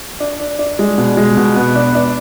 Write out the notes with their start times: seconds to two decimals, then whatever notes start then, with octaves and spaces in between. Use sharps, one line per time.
0.20 D4
0.40 D4
0.59 D4
0.79 G#3
0.98 B2
1.17 G#3
1.37 B2
1.56 B3
1.75 D4
1.95 D4